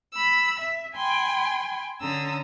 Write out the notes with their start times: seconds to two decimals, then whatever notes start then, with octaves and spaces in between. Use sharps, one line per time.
0.13 B5 E6
0.60 E5
0.96 G5 G#5 B5 C6
2.01 D3 C#4 A#5 D#6 E6